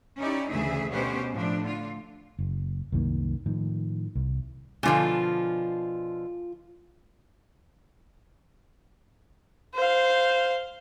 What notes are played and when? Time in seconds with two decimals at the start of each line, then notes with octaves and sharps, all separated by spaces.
0.17 C#4 D#4 E4 G4 D5
0.49 D2 C#3 E3 A3 G#4 E5
0.89 B2 B3 C#4 G4 C5
1.31 A2 F3 D4
1.62 D3 F4
2.39 F#1
2.92 C2 F#2 D#3 A#3
3.46 A2 D#3 F3
4.15 C2
4.83 B2 D3 F3 F4 G#5
9.75 C5 F5